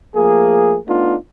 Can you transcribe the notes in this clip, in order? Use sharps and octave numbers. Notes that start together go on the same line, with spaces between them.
F3 A3 A#3 G#4
A3 B3 D4 D#4 F4